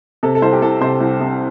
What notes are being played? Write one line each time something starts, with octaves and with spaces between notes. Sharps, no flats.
C3 A4
A4
C2 C5
G4
C2 A4
C3 C5
C2
C3